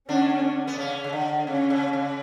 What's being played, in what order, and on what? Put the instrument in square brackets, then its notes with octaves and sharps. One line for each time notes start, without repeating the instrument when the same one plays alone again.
[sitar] D3 D4 [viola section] C#4
[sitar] B3
C#3 C#4
C#3
D3
[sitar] C#3 [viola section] C#4
[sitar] C#3
C#3